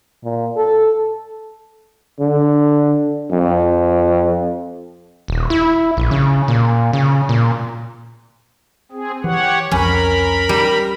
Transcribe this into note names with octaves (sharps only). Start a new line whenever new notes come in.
A#2
A4
D3
F2
D#1
E4
A#1
C#3
A#2
C#3
A#2
C4 G#4
E3 G4 C#5 F#5
C2 F2 F3 C#4 A#4 B5
G3